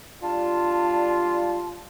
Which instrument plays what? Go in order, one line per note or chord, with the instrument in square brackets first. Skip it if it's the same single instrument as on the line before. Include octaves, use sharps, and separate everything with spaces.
[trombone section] G3 D4 F4 [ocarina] A5